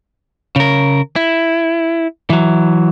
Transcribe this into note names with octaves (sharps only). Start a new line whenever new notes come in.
C#3 A#4
E4
E3 F#3